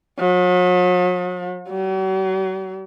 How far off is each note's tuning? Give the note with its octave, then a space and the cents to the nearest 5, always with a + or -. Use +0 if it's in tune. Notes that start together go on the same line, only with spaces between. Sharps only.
F#3 -45
F#3 +45